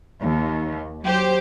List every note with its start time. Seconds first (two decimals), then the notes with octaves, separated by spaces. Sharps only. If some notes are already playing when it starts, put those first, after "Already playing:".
0.20 D#2
1.03 F#3 G4 C5